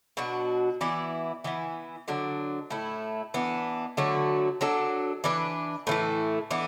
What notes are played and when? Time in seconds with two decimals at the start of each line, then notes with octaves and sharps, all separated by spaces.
0.17 B2 F#3 D4 F#4
0.81 E3 B3 E4 D5
1.44 E3 B3 E4
2.08 D3 F#3 D4
2.70 A2 A3 E4
3.34 E3 B3 D4
3.97 D3 F#3 A3 F#4
4.61 F#3 D4 A4
5.24 E3 D4 B4
5.87 A2 E3 A3
6.51 E3 B3 D4